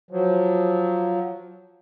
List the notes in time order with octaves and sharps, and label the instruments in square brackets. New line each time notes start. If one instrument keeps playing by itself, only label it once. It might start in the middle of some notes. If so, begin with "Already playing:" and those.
[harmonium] F3 F#3